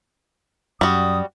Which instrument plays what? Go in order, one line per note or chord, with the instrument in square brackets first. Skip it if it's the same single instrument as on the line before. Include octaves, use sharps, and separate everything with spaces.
[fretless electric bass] F#2 [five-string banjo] G3 F#4 [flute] D#6